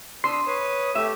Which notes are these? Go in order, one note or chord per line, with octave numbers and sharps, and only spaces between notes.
D4 C6 D#6 E6
B4 C#5 D#6
A3 G4 E5